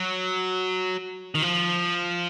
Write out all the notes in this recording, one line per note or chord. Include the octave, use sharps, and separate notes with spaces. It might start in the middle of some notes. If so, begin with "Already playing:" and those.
Already playing: F#3
D#3
F3